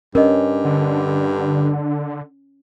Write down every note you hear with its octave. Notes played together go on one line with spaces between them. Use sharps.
G2 C#4 A#4 D#5
D3